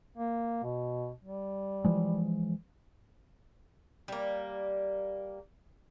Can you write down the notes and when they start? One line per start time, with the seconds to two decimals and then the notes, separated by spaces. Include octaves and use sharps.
0.18 A#3
0.63 B2
1.25 G3
1.84 E3 F3 G#3
4.08 G3 A#3